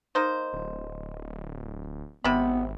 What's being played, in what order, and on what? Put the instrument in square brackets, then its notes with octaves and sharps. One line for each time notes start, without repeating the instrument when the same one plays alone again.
[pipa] A#3 D#4 C5
[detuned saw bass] D1
[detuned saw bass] G#1 [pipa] C3 B5 [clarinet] B3